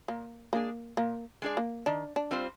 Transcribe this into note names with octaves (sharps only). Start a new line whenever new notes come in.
A#2 A#3
G#3 A#3 D4 G#4 D5
A#2 A#3
G#3 D4 G#4 D5
A#3
D#3 D4
D4
G3 C4 F4 C5